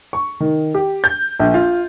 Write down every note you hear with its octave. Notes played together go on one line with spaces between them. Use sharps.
C#6
D#3
G4
G6
A#1
F4